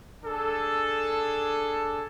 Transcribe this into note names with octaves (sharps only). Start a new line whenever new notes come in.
D4 G#4 A4